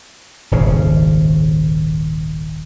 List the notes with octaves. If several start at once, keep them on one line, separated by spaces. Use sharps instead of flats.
D#1 G#1 C#3